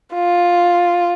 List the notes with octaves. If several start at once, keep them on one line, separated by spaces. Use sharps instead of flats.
F4